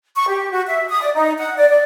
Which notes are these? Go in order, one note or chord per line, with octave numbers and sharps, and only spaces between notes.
C#6
G4
F#4
E5
D#6
D5
D#4
F#5
D5
D5